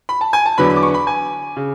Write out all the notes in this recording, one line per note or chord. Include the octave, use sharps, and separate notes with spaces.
B5
A5
G#5
A5
E2 D3 F#3 B3 B5
B5
D6
C#6
B5
G#5
C#3